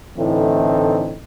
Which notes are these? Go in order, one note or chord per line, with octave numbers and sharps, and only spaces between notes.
A2 D3 E3 A3 C4 D#4